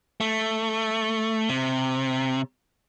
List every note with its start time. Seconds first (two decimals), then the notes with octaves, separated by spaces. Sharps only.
0.21 A3
1.49 C3